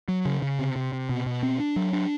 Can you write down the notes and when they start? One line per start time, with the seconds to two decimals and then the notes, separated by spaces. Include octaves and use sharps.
0.08 F#3
0.25 C#3
0.42 C#3
0.59 C3
0.76 C3
0.93 C3
1.09 B2
1.26 B2
1.43 C4
1.60 D4
1.76 F#3
1.93 D4